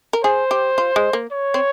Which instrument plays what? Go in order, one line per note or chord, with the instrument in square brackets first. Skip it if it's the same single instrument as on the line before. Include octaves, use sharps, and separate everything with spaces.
[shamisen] A#4
[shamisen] G#4 [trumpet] C5
[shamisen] G4
F4
G#3
A#3
[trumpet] C#5
[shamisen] C4